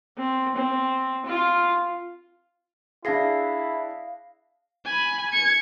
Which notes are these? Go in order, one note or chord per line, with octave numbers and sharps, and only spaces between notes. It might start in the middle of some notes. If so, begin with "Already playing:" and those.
C4
C4
F4
D4 E4 G#4 F5 A#6 C7
G#5 B5
G#6 C#7